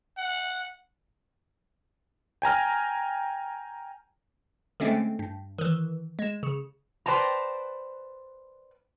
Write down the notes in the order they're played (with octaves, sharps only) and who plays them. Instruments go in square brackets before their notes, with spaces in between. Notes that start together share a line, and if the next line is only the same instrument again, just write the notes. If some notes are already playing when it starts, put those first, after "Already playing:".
[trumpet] F#5
[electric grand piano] G5 G#5 A#5 F6
[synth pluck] D3 G#3 A3 C4 C#4
G2
D#3 E3
G#3 E7
C#3
[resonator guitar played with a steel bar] B4 C5 D5 G5 A5 A#5